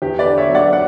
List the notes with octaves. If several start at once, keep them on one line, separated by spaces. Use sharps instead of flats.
E2 G4
B4 D5
D3
C#5 E5
F#3
D5 F#5
F#5